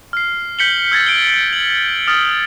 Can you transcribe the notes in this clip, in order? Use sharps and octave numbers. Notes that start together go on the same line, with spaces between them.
F6 C7
G6 B6 C#7 F#7 G7
E6 G#6 A6 B6
D7 G7
F#7
D#6 F6 A6